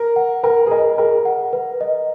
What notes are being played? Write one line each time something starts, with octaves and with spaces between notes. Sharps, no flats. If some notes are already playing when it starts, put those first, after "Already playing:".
Already playing: A#4
F#5
A#4 B4
G#4
A#4 D#5
G#4 A#4
F#5
B4
D#5